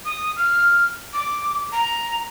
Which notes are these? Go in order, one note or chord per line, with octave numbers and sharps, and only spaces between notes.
D#6
F6
D6
A#5